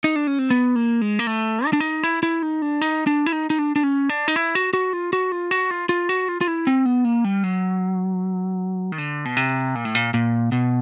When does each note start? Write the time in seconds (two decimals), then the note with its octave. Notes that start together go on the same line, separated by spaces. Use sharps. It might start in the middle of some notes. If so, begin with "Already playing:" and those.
0.04 D#4
0.16 D4
0.27 C#4
0.39 C4
0.50 B3
0.76 A#3
1.01 G#3
1.19 A#3
1.27 A3
1.66 D#4
1.73 D4
1.80 D#4
2.03 E4
2.23 E4
2.42 D#4
2.62 D4
2.82 D#4
3.07 D4
3.26 E4
3.32 D#4
3.50 D#4
3.59 D4
3.76 D4
3.83 C#4
4.09 D4
4.28 D#4
4.36 E4
4.55 F#4
4.73 F#4
4.93 F4
5.13 F#4
5.32 F4
5.51 F#4
5.71 F4
5.89 F4
6.09 F#4
6.28 F4
6.41 F4
6.48 E4
6.67 C4
6.86 B3
7.05 A#3
7.24 G3
7.44 F#3
8.92 D#3
8.98 D3
9.25 B2
9.37 C3
9.75 A#2
9.85 A2
9.95 A#2
10.14 A#2
10.52 B2